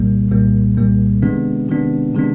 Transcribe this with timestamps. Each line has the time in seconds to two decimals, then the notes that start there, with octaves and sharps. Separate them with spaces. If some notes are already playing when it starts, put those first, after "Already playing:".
Already playing: C2 A#2 G3 A#3
0.31 C2 A#2 G3 A#3
0.77 C2 A#2 G3 A#3
1.22 C3 D#3 G#3 B3 D4
1.69 C3 D#3 G#3 B3 D4
2.14 C3 D#3 G#3 B3 D4